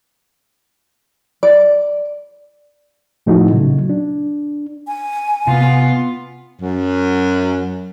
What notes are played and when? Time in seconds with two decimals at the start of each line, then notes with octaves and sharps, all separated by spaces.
1.43 D5
3.27 A2 F3 A3 D#4 E4 F#4
3.50 A#2 C#3 F#3
3.90 D4
4.87 G#5
5.47 C3 B3 F4
6.59 F#2